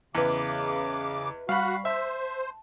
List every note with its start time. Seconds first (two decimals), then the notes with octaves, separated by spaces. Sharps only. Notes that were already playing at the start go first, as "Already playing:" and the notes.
0.15 E2 C#3 B4 D#5 E5 D6
1.49 G3 F#4 F5 F#5 B5 C#6
1.85 C5 E5 A5